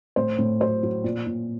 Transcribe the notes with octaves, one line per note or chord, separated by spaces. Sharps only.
A2 C5
A2
F#3 C5
F#3
A#2
A#2